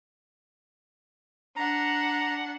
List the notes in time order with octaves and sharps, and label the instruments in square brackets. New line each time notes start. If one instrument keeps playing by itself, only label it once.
[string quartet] D4 F#5 [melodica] A#5